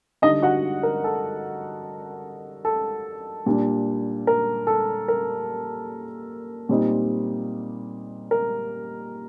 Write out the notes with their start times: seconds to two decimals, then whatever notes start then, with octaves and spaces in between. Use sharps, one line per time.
0.22 D3 G3 D4 D#4 D#5
0.42 F#4 F#5
0.83 A#4
1.04 A4
2.65 A4
3.46 A#2 G3 D4
4.27 A#4
4.67 A4
5.08 A#4
6.69 A#2 G3 C4 D#4
8.31 A#4